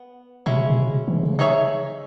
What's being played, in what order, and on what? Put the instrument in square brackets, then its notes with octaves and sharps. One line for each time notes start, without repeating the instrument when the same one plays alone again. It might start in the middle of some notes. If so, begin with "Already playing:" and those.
Already playing: [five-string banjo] B3
[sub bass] B2 [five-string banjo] G#3 C#4 E4
[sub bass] C#3
B2
C#3
E3
C#3
[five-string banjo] D#4 G#4 C#5 E5